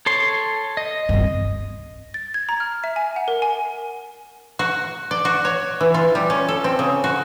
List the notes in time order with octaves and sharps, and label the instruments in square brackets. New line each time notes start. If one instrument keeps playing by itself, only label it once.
[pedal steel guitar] A4 C#5 C6
D#5
[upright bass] G2 C3
[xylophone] A6
G#6
A#5
F6
E5
G#5
F#5
A#4
G#5
[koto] F#4
D5
F#4
C#5
E3
F4
G3
C#4
A4
C4
C#3
F#4